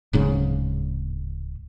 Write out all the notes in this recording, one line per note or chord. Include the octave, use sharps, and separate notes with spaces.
D1 G#2 C#3